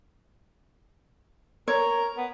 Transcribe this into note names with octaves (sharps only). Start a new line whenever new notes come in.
A#4 C#5
B3